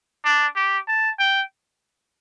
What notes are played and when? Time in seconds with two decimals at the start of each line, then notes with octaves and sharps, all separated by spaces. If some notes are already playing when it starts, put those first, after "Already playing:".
0.25 D4
0.56 G4
0.88 A5
1.19 G5